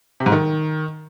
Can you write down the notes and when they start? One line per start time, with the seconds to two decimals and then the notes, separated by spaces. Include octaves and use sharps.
0.20 C3
0.26 G#2
0.32 D#3